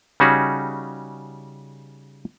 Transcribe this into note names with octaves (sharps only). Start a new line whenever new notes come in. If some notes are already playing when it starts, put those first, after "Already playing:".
C#3 G3 C#4 D#4 F#4 G#4